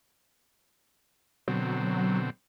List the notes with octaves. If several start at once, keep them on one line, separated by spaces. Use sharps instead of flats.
B2 D3 F#3 C4